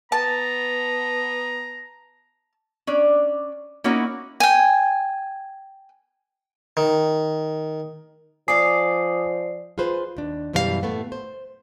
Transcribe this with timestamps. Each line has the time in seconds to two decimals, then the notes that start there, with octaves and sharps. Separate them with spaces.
0.12 B3 A5 A#5
2.87 C#4 D4 D5
3.84 A#3 C#4 D#4 E4 F#4
4.40 G5 G#5
6.77 D#3
8.48 F3 D5 F5 G#5 D6 D#6 C7
9.78 F4 G#4 B4 C5
10.17 D#2 D4
10.53 F#2 B2 E3 G3 A#4 F5
10.83 A2 A3 B3
11.12 C5